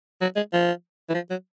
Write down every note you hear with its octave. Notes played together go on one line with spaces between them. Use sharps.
F#3
G#3
F3
E3
F3
F#3